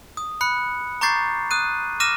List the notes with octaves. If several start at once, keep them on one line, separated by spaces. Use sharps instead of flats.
D#6
B5 F#6 C#7
A#5 C#6 D6 G6 A6 C7
D#6 F#6 D#7
D6 F6 A#6 D#7 E7